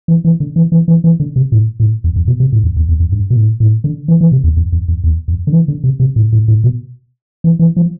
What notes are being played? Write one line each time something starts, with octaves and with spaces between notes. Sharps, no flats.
E3
E3
D3
E3
E3
E3
E3
D3
C3
A2
A2
F2
F2
B2
C3
A2
F2
E2
E2
F2
G2
B2
A2
A2
D3
E3
E3
C3
E2
F2
F2
F2
E2
F2
D3
E3
D3
C3
C3
A2
A2
A2
B2
E3
E3
F3